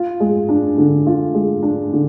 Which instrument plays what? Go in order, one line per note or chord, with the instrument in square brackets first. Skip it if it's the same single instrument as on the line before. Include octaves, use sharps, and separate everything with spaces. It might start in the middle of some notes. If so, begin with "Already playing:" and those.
Already playing: [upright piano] F4
G#3
D4
D3
F4
G#3
D4
D3